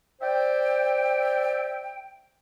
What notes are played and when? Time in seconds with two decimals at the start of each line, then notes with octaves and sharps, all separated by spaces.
0.21 C5 D5 E5 G5